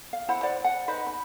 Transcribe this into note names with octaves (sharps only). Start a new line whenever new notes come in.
F5
E4 C5 F#5 B5
C5 D5 F#5
F#5
D#4 B4 C5 D#5
B5